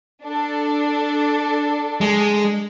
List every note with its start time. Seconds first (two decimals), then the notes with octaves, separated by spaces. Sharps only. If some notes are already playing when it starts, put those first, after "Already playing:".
0.23 D4 A4
2.01 G#3